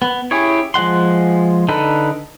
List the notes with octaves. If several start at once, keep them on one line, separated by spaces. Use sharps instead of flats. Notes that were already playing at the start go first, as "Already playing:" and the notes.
B3
C#4 E4 G4 G#4 C#5
F3 G#3 F#5 C6
D3 D#4 A4 B4